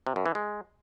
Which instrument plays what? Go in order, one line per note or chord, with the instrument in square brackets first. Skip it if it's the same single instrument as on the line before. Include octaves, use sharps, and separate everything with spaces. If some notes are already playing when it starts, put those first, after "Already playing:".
[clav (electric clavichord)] C3
F#2
E3
G#3